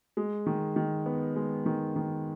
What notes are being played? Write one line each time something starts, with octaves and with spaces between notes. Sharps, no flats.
G#3
D#3
D#3
B3
G#3
D#3
D#3